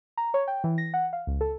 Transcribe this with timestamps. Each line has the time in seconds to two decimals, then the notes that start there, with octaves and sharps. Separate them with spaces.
0.17 A#5
0.34 C#5
0.48 G5
0.64 E3
0.78 A#6
0.94 F#5
1.13 F5
1.27 C#2
1.41 A4